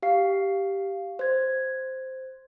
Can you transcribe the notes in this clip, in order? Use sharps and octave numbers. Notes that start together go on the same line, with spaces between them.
G4 F5 C7
C5 G#6